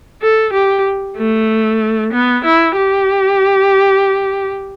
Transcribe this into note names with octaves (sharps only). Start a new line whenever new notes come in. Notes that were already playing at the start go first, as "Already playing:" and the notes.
A4
G4
A3
B3
E4
G4